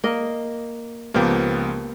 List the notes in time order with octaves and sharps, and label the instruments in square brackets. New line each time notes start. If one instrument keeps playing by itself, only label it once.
[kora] A#3 D#5
[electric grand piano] C#2 F3 B3 [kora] A#3 G4